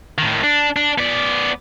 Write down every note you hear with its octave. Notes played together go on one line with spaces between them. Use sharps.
A2 D#3
D4
D4
B3 D5